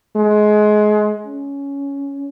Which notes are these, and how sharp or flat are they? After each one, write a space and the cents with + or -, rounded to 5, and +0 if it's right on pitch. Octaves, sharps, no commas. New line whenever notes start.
G#3 +25
C#4 +10